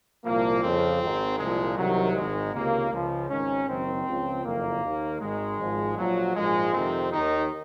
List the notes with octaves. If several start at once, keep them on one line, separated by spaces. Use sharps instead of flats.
C2 A#2 F3 A#3
F2 C#3 F3 C4
G#1 G#2 D#3
C2 A#2 F3 G#3
C2 C3 D#3 F#3
G#1 G#2 D#3 G#3
C#2 C3 D#3 A#3
C#2 C#3 F3
G#1 G#2 D#3 C#4
F#1 F#2 D#3 C4
C#2 C#3 F3
F#1 F2 D#3 A#3
D#2 D#3
G#1 G#2 D#3 G#3
G#1 G#2 F3
A#1 A#2 F3 F#3
A#1 G#2 F3 G#3
F2 C3 D#3 C4
D#2 D#3 D#4